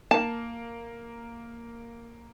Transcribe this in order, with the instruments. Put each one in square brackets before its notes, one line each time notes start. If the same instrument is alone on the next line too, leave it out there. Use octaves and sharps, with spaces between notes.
[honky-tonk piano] A#3 [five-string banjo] A5